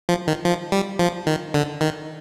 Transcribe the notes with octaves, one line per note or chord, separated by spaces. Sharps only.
F3
D#3
F3
G3
F3
D#3
D3
D#3